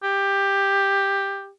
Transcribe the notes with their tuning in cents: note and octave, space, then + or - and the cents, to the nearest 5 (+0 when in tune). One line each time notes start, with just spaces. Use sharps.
G4 +10